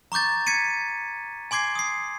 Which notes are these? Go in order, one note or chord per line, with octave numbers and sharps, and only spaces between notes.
A#5 C#6 D6 G6 A6
G#6 B6 C#7 D#7
G#5 C6 D6 G#6 C7
D#6 C7